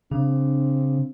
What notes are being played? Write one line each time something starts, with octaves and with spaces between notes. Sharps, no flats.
C#3 C4 D4